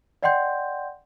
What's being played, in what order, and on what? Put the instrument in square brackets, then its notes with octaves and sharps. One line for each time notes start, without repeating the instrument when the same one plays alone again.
[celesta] D5 D#5 F#5 G5 C6 G6